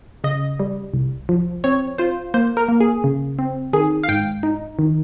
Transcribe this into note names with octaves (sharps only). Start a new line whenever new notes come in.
C#3 D#5
G3
C2
F3
C4 C#5
F4 C5
A#3 C5
A#4
A#3
G#4
C#3
C4
D#3 G#4
F5
G#2 G5
D#4
D#3